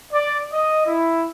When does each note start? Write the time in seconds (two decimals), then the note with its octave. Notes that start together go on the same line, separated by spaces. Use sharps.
0.12 D5
0.53 D#5
0.86 E4